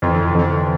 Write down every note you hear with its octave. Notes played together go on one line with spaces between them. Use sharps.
F2 E3
D3
C3
F2 D3